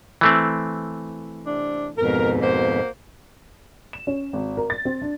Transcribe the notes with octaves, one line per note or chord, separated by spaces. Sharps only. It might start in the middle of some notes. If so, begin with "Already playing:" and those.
E3 A3 C4
C3 D4
F2 G#2 B2 A#4
A#3 F#4 C5
E7
C#4
G#1
A#4
A6
C4
D4